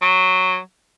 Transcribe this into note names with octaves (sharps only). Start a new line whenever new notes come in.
F#3